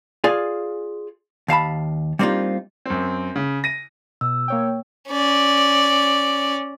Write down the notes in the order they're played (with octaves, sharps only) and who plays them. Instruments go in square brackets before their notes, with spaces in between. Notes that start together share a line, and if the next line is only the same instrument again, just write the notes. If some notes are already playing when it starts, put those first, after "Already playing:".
[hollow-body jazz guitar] F4 G#4 D5 F5 G#5
D#2 F5 A5 B5
G3 A#3 C4 D4 D#4 F4
[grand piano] F#2 C4
C#3
A#6 D#7
[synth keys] B2 [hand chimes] E6
[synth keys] A#3 C#5 G5
[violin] C#4 D5